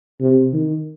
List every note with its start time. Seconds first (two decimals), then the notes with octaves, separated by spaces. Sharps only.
0.21 C3
0.53 D#3